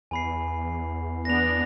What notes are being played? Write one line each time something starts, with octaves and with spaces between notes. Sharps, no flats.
E2 G#5 B5 C7
B3 D4 A#6 F7